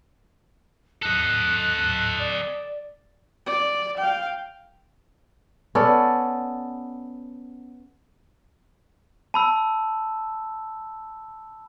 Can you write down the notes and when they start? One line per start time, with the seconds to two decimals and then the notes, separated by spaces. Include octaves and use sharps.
1.03 A4 D#5 F#6
2.19 D5
3.46 D5
3.97 F5 G5
5.75 B3 C#4 A4 D5
9.34 A5 B5 E6